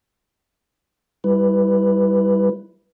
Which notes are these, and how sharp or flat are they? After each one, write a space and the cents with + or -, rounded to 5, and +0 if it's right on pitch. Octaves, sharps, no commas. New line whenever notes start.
G3 +0 E4 +0 B4 +0